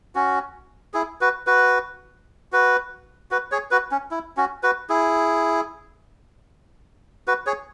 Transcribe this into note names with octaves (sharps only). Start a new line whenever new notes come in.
C#4 F#4
E4 G#4
F#4 B4
F#4 B4
F#4 B4
F#4 B4
G#4 C#5
F#4 B4
C#4
E4
C#4 F#4
F#4 B4
E4 G#4
F#4 B4
G#4 C#5